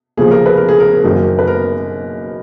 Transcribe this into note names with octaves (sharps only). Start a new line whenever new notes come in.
D#2 C#3 F3 G#4
A#4
B4
A#4
G#4
A#4
F#1 F#2 D#3 A#3
B4
A#4